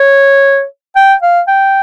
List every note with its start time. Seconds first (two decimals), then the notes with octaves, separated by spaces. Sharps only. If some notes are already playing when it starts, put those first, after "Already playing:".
Already playing: C#5
0.96 G5
1.23 F5
1.48 G5